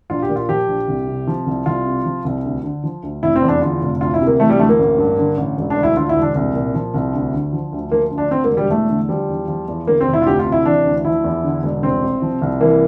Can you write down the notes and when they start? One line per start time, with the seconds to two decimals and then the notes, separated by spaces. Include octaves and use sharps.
0.10 A#1 F4
0.23 G4
0.29 A#2
0.36 F4
0.49 F3 G4
0.68 A#1
0.88 C2
1.08 C3
1.27 F3
1.46 C2
1.66 C2 F4
1.86 C3
2.05 F3
2.25 C2
2.44 D2
2.64 D3
2.84 F3
3.03 D2
3.23 F1 E4
3.35 C4
3.42 E2
3.48 D4
3.61 D3 F4
3.81 F1
4.00 D2 F4
4.14 E4
4.20 C3
4.27 A#3
4.40 E3 A3
4.49 G3
4.59 D2 A3
4.69 A#3
4.79 A1
4.98 G2
5.18 D3
5.37 A1
5.57 E1
5.70 D4
5.76 D2
5.83 E4
5.96 D3 F4
6.09 E4
6.16 E1
6.22 D4
6.35 C2
6.55 A#2
6.74 F3
6.94 C2
7.14 D2
7.33 D3
7.53 F3
7.73 D2
7.91 F3 A#3
8.12 D2
8.18 D4
8.31 D3 C4
8.44 A#3
8.50 E1
8.57 G3
8.70 E2 A3
8.90 D3
9.09 F3 G3
9.28 E2
9.48 F3
9.68 E2
9.87 D3 A#3
10.00 C4
10.07 F1
10.13 E4
10.22 F4
10.27 D2 G4
10.39 F4
10.46 C3
10.52 E4
10.66 E3 D4
10.85 D2
11.05 F3 E4
11.24 E2
11.43 D3
11.63 E1
11.83 C2 C4
12.02 C3
12.22 F3
12.42 C2
12.61 E3 A#3